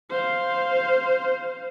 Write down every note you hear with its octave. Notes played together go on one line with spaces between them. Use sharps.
C5 F5